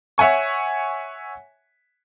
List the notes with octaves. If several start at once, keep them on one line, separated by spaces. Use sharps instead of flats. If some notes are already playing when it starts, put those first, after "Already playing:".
C#5 E5 F#5 G#5 C#6